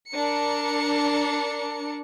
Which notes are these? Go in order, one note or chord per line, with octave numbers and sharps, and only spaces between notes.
D4 A#4 C#7